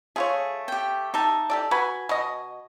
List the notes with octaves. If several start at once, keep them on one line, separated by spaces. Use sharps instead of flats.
A3 F4 G#4 C#5
G4 G5
D#4 G4 E5 A5
G4 A4 D5
F#4 B4 G#5 B5
B2 D#5